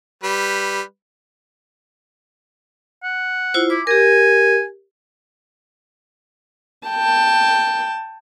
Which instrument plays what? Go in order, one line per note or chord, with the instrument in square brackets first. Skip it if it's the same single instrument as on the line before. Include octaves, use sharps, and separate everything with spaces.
[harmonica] G3 B4
[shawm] F#5
[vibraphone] E4 F4 C5
[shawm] E4 [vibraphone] D6
[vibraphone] G4 A#4 [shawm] G#5
[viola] G5 A5